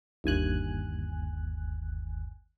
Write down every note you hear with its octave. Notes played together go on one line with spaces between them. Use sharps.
G1 D#2 G#5 F#6